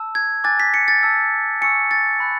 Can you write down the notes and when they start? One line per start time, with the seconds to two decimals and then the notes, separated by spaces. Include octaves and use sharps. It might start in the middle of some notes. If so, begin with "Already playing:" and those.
Already playing: A5 E6
0.15 G#6
0.44 G#5 D6 F#6 A6
0.60 B6
0.74 C#7
0.88 A6
1.03 A5 E6
1.61 G#5 C#6 E6 C#7
1.91 A6
2.20 B5 F#6